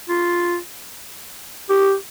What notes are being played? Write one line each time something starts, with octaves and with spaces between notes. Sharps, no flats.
F4
G4